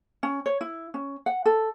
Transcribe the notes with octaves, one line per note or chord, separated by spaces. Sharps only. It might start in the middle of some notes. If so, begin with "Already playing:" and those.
C#4
C#5
E4
C#4
F#5
A4